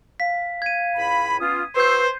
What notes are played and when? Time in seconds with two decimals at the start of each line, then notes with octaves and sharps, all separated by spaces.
0.20 F5 B6
0.62 G#6 D#7
0.96 C#2 A2 B5
1.40 B3 C#4 F4 D#6
1.76 F#4 B4 C5 C#6 E6 G6 C7